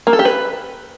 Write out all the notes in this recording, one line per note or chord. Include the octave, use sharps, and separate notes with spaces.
A#3
A4
G4
B4